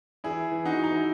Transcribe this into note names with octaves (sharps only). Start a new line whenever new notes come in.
E3 E4 G#4
E3
D#4 F#4
E3 D#4
E4